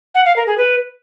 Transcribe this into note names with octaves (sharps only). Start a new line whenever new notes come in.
F#5
F5
A#4
G#4
B4